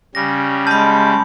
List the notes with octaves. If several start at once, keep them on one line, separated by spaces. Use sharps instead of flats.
C#3 G3 A#6
G#3 A5 B5 G6